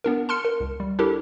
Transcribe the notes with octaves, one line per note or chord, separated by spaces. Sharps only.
B3 D4 A#4
A5 C6 F6 C#7
A#4
C#2
G3
D4 E4 G4 A4 A#4